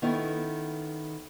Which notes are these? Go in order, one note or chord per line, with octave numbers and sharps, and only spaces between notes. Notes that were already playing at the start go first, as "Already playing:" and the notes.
D#3 B3 C#4 E4 A4